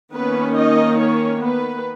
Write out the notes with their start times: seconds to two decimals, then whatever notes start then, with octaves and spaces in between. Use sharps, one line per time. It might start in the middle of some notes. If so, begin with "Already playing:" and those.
0.12 D#3 A#3 B3 C#4 B4
0.56 D#4 D#5
0.99 C#4 C#5
1.42 B3 B4